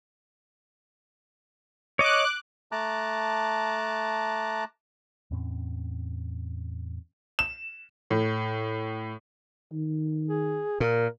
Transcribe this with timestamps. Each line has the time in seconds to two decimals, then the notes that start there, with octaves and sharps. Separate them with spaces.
1.99 C#5 D#5 D6 F#6
2.72 A3 A5 A#5 D6 F#6
5.31 E2 A2 C4 C#4
7.39 E7
8.11 A2
9.72 D#3
10.28 G#4
10.80 A#2 A#4